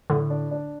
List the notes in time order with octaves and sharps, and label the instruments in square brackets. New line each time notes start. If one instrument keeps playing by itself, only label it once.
[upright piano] A2 [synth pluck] D3
[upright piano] D4
D4